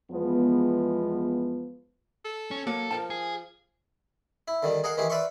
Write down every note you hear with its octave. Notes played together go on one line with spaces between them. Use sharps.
E2 F3 G#3 B3
A4
C#4
F#3 A#3 A4 A#4
F3 A#4 G5 A5
G#4
E4
D3 D#3 G3
G#4 A#4 D#5 F5 F#5
D#3 E3 G#3 G4 G#4
B4 D5 E5 F5 C6 C#6